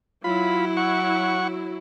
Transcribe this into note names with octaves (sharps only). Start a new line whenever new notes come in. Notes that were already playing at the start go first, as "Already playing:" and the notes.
F#3 E4 F4 B5
F#5 C#6